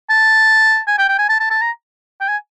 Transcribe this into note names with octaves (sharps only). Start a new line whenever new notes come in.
A5
G#5
G5
G5
G#5
A5
A5
A5
A#5
G5
G#5